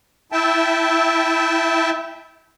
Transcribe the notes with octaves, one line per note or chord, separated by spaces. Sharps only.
E4 E5 G5 A5